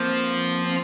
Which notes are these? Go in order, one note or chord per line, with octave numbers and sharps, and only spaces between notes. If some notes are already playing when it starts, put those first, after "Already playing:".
Already playing: F3 A#3 C4
C4